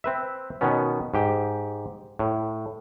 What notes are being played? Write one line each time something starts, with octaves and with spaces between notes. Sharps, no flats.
C4 B4 E5
B2 D#3 B3 C#4
G#2 G4 G5
A2